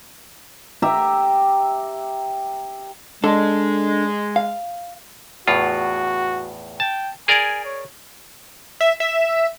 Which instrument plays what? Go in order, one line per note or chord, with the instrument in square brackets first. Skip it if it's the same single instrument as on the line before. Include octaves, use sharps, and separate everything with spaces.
[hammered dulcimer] G4 E5 A#5
[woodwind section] G#3 [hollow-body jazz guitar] D4 A4
[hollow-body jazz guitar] F5
[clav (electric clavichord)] E2 A2 F4 [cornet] F#4
[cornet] G5 [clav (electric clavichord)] A5
[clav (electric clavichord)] G#4 A#4 D5 [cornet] G#5
[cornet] C#5
[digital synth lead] E5
E5